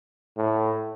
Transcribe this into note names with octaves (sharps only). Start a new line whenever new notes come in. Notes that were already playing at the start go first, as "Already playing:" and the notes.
A2